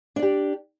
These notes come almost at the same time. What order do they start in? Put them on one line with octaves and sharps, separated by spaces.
D4 D5 G4